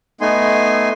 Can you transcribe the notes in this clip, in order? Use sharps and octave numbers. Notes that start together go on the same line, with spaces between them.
A3 B3 D#4 G#5 C6